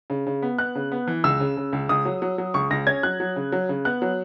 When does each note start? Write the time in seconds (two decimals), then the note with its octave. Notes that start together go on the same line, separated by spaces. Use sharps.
0.10 C#3
0.27 C#3
0.42 B3
0.58 B3 F#6
0.75 C#3
0.92 B3
1.07 E3
1.24 C#2 E6
1.40 C#3
1.57 C#3
1.73 C#2
1.89 C#2 D#6
2.05 F#3
2.22 F#3
2.38 F#3
2.54 C#2 C#6
2.71 C#2 A#6
2.87 C#4 G#6
3.03 F#3 F#6
3.20 F#3
3.36 C#3
3.52 F#3
3.69 C#3
3.85 B3 F#6
4.02 F#3